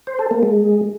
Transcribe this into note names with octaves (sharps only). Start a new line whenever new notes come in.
C5
A4
A#3
G#3